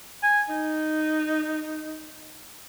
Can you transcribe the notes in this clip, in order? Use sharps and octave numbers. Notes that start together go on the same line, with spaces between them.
G#5
D#4